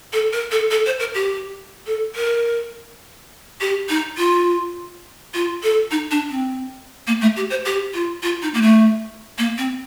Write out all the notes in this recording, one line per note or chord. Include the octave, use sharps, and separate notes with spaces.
A4
A#4
A4
A4
C5
A#4
G4
A4
A#4
G4
D#4
F4
F4
A4
D#4
D4
C4
A#3
A3
G4
C5
G4
F4
F4
D#4
A#3
A3
A#3
C4